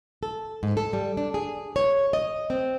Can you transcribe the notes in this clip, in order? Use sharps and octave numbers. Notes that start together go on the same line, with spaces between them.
A4
G#2
A4
G3
D4
G#4
C#5
D#5
C4